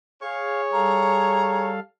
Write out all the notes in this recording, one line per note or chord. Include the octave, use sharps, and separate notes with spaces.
G#4 C#5 F5
G3 A4 F5 A#5